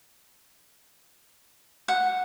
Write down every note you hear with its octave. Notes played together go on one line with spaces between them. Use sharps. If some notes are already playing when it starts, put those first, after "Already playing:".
F#5